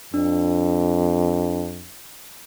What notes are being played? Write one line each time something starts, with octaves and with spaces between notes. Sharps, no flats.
F2 D4